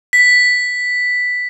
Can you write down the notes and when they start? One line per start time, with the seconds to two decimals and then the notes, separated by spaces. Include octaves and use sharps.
0.13 B6